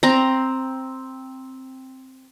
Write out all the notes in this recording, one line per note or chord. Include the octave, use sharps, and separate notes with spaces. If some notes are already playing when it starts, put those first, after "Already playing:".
C4 A#5 C6